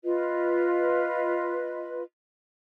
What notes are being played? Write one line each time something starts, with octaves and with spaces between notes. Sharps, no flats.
F4 B4 D#5